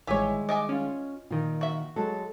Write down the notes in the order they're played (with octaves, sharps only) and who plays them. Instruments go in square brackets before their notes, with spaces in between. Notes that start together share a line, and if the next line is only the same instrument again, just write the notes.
[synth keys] A1 E5 G#5 [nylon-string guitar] D#3 G3 G#3 [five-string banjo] G4 C#5
[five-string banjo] D#5 E5 G#5 [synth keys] D6
[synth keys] C#4 F4
[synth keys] A#2 D#3 [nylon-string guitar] F4
[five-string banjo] F#4 E5
[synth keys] F#3 G#3 [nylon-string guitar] A4